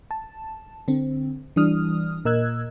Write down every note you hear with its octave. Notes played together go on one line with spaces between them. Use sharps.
A5
D3 C4
E3 G3 D4 D#6 F6
A#2 A#4 D#5 E6 F#6 G#6